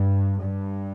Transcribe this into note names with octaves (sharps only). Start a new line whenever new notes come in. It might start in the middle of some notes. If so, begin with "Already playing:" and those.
Already playing: G2
G2